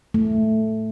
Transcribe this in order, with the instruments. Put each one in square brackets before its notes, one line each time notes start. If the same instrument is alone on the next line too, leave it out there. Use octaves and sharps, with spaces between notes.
[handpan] A3